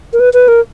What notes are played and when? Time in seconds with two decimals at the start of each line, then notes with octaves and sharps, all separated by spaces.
0.13 A#4
0.20 B4
0.34 B4
0.48 A#4